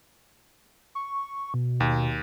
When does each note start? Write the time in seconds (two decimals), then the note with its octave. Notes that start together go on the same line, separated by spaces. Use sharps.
0.95 C#6
1.54 B2
1.80 D#2